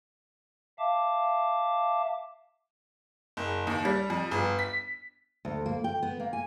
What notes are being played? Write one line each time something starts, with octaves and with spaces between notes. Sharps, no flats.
E5 F5 A5 D6
F#1
D#2
G3
F2
G1
B6
D2
A#3
G5
B3
A#3
G#5